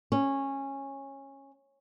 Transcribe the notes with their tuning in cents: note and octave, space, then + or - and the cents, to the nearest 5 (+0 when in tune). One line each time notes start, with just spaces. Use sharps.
C#4 -15